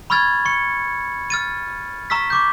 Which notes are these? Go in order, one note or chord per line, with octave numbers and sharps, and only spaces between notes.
B5 C#6 E6 F6 G#6 A6
C#6 C#7
F6 A6 D#7
A#5 C#6 E6 F6 B6
C#6 D6 G6